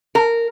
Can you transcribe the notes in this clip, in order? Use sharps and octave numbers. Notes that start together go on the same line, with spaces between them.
A#4